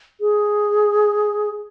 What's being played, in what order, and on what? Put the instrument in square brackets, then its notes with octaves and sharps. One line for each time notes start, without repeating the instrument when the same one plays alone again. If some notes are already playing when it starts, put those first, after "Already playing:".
[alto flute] G#4